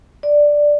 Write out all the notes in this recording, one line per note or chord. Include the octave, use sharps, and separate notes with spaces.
D5